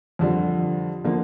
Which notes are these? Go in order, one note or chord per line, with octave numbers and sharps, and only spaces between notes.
F2 D3 G3
D3 F3 A#3